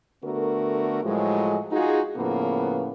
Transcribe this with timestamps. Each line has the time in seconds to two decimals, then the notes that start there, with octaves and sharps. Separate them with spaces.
0.24 D3 A3 B3 F#4 A#4
1.04 A2 F3 F#3 G#3
1.72 D#4 F4 F#4 G#4
2.17 A2 C#3 F3 A#3 B3